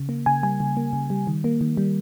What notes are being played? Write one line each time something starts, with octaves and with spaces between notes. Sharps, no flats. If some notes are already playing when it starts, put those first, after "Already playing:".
Already playing: C#3
A#3
C#3 G#5
G3 G#5
C#3
A#3
C#3
G3
D#3
A#3
D#3
G3